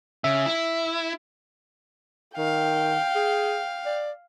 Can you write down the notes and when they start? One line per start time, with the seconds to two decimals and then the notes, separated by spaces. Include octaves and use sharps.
0.24 C#3 E5
0.46 E4
2.37 D#3 F5 G5
3.15 G#4
3.86 D5